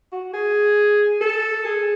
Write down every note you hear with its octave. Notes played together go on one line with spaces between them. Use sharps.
F#4
G#4
A4
G#4